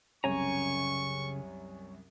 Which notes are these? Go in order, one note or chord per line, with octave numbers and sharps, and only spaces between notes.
C2 F#2 C#3 C#5 G#5 A#5 C#6